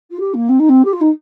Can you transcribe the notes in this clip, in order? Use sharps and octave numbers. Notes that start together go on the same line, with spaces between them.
F4
G4
A#3
C4
D#4
C4
G4
F4
D#4